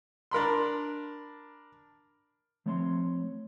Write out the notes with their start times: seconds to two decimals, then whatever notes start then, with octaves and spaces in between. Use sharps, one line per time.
0.31 D4 A#4 B5 C6
2.66 F3 A3 C4 C#5 A#5 C6